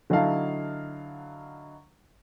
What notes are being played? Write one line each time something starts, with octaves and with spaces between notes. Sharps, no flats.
D3 F#3 D#4 E4 F5 A5